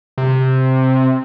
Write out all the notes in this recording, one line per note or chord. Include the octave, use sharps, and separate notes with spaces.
C3